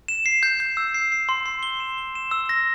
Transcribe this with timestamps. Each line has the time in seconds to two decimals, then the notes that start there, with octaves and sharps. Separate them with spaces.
0.08 E7
0.26 C7
0.43 G6
0.60 G6
0.77 E6
0.94 C7
1.12 C7
1.29 C6
1.46 C6
1.63 G7
1.80 E7
1.98 G7
2.15 E7
2.31 E6
2.49 A#6